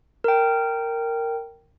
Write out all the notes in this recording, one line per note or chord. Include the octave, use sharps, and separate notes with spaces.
A#4 G5